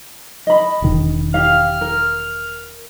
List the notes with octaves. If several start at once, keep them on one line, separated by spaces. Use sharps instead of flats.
D#5 B5
E1 D#3
G4 F5 F6
A#4